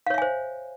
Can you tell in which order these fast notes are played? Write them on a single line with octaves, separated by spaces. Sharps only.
F5 C#5 E5 G#5 C5